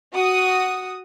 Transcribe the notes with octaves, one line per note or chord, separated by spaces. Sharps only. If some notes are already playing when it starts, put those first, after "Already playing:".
F#4 D#6